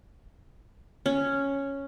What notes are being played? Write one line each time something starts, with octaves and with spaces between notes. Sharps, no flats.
C#4